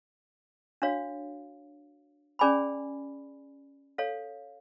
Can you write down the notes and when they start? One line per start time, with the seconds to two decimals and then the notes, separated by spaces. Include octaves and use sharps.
0.82 D4 F#4 C#5 F5
2.39 C#4 G#4 D5 G#5 B5
3.98 A4 C#5 F5